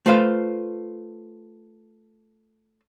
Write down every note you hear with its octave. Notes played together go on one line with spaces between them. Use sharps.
A3 F4 B4 C5 F5